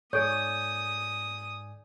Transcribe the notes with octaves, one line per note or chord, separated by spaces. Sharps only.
G#2 A4 C#5 D5 G#5 D#6 G6